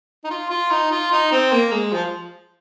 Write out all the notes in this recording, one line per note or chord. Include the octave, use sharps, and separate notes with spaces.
D#4
F4
F4
D#4
F4
D#4
C4
A#3
G#3
F3